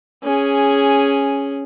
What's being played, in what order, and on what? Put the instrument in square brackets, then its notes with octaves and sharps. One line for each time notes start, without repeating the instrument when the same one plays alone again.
[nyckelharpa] C#4 G#4